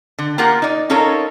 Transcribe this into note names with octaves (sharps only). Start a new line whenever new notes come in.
D3
A#3 F4 G4 A#4 F#5
D#4 D5
C#4 D#4 F4 A4 A#4 C#5